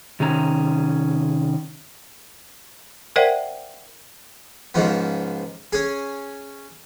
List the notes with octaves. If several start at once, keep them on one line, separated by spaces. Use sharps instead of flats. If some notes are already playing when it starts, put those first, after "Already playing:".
C3 D#3 C#4 A#5
A#4 C5 D5 E5 F#5 G5
C#2 G#2 F3 B3
C#4 G#4